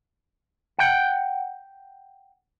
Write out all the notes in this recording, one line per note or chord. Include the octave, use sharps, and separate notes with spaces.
F#5 G5